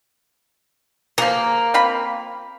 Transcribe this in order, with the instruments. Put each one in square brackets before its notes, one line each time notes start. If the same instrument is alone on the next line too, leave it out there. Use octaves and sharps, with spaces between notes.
[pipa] F3 G#4 [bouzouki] A#3
[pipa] C4 F4 B5